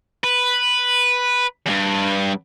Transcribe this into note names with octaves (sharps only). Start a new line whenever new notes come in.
B4
E2 G2